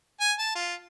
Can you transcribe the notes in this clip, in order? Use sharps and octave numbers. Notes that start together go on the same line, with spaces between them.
G#5
A5
F4